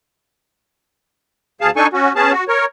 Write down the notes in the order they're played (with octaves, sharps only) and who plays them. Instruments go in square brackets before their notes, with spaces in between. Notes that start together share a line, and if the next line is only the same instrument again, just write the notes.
[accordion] D2 G#4 F5 A5
D4 D#4 A4 G#5 C#6
C#4 F#4
B3 C#4 G#4 A5
F#4
A#4 C#5